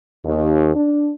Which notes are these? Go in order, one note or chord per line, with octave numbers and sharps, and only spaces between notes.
D#2
D4